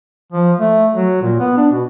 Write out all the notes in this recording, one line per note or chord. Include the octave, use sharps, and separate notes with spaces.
F3
A3
F#3
A#2
B3
D4
B2